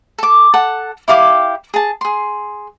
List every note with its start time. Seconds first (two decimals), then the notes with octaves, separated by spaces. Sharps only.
0.18 A4 D6
0.54 A4 F#5 A5
1.08 E4 G4 F5 D6
1.74 G#4 A5
2.01 G#4 C6